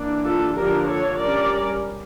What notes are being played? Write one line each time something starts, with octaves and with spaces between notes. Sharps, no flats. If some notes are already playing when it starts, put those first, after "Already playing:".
Already playing: E3 A#3 D4
F4 A4
D3 F3 A#3 D4 G4 A#4
A4 C#5
G3 C#4 A#4 D5